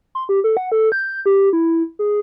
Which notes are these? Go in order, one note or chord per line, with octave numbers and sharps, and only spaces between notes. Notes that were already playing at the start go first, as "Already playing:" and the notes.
C6
G4
A4
F#5
A4
G6
G4
E4
G#4